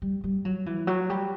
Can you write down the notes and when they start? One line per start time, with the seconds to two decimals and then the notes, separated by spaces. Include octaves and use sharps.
0.02 G3
0.24 G3
0.45 F#3
0.66 E3
0.87 F#3
1.10 G3